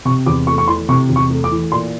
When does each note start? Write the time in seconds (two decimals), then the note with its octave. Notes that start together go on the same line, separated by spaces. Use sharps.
0.05 C3 C#6
0.26 E2 D6
0.47 A3 C#6
0.58 C#6
0.68 E3 C6
0.89 C3 C#6
1.09 E2
1.16 C#6
1.30 A3
1.44 D6
1.51 E3
1.72 A#2 C6